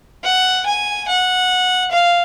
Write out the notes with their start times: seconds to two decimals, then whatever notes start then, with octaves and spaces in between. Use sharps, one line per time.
0.24 F#5
0.66 G#5
1.08 F#5
1.91 F5